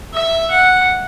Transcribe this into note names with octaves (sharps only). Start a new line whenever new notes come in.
E5
F#5